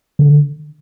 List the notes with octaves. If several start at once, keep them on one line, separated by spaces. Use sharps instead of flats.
D3